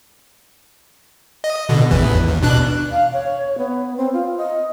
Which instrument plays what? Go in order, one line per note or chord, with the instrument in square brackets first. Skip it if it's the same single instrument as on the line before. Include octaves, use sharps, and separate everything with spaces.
[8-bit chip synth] D#5
B2 D3
A1 E2 E3
D#2
B2 D4 F#6
[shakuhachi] F5
C#5
B3
C4
F4
D#5